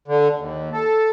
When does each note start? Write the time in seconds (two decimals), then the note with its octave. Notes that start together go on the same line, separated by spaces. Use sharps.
0.08 D3
0.39 D#2
0.73 A4